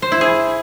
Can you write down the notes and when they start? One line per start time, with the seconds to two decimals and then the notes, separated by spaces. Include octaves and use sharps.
0.02 C5
0.12 E4
0.21 G#4